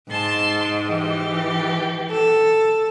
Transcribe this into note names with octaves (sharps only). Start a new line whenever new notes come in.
G#2 A5 C6
E3 G4
A4